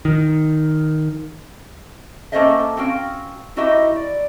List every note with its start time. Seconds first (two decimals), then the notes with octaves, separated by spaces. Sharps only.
0.05 D#3
2.32 A#3 C#4 A4 C5 D#5 E5
2.77 C4 C#4 F#4 F5 G5
3.56 D#4 E4 F#4 G4 D#5 E5
3.96 D5